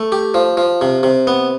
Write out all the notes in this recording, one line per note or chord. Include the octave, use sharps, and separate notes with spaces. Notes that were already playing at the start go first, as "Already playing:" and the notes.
Already playing: A3
G4
F3
F3
C3
C3
B3